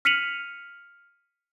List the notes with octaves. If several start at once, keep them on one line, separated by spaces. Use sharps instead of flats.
F6 B6 C#7 D#7 F7 F#7